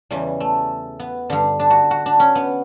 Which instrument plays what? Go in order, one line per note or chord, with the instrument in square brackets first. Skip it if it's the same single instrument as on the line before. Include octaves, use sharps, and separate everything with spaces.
[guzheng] E2 C#3 E3 G3
A3
B3
G2 D3
D4
F#4
F#4
D4
C#4
B3